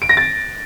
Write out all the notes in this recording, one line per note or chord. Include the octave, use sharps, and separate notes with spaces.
D7
A#6
A6